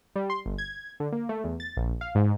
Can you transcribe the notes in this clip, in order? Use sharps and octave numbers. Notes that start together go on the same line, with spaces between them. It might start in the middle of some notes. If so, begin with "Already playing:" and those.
G3
C6
G1
G#6
D3
A#3
A3
E2
A6
A#1
F5
G#2